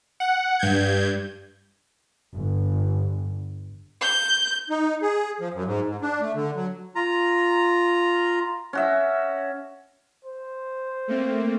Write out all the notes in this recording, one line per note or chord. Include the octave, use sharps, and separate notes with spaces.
F#5
G2 G6 G#6
G1
G6
D#4
G#4
F3
F#2
G#2
G#2
D4
A3
D3
F#3
F4 A#5
C#4 F#4 E5
C5
A3 A#3 C4